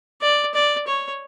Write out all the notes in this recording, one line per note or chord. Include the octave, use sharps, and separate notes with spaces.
D5
D5
C#5